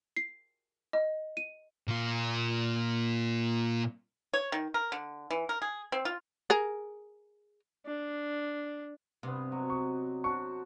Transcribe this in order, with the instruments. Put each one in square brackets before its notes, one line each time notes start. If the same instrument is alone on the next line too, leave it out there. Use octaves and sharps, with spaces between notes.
[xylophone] C7
D#5
D#7
[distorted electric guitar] A#2 F4
[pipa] C#5
D#3
A#4
D3
E3
A#4
G#4
C4
F4
[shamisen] G#4 A#4
[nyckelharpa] D4
[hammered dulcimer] G2 B3 [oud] C3
[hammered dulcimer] F#3 C#5 D#5
[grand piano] C#6
[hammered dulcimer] D4 F#4 C5 [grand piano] C#6